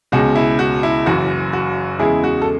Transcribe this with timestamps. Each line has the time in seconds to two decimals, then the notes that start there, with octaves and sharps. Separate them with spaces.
0.12 C#2 B2 G#3 C#4 F#4
0.36 E4
0.59 F#4
0.83 E4
1.06 F#1 F#2 E3 F#4
1.53 F#4
1.99 E2 C#3 G#3 E4 G#4
2.24 F#4
2.42 A4